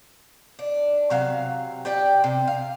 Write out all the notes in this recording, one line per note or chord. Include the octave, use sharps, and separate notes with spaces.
D4
C3 F#3 F5
G4 D5 G5
C3
F5